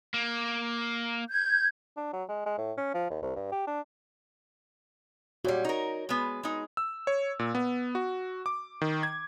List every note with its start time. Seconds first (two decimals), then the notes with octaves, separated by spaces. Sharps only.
0.14 A#3
1.30 G6 G#6
1.96 D4
2.13 F#3
2.28 G#3
2.46 G#3
2.58 A2
2.77 C#4
2.94 F3
3.10 D#2
3.22 C2
3.36 G2
3.52 G4
3.67 D4
5.44 A#2 G3 F#4 C#5
5.64 D#4 A#4
6.09 G#3 B3
6.43 G#3 D#4
6.77 E6
7.07 C#5
7.39 A#2
7.55 B3
7.95 F#4
8.46 D6
8.81 D#3
9.03 G#6